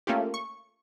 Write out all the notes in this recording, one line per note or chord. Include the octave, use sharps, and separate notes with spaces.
A3 A#3 C#4 F4 G4
C#6